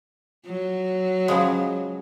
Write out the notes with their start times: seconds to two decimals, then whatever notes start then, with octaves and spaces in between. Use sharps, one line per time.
0.47 F#3
1.28 C#3 F3 G#3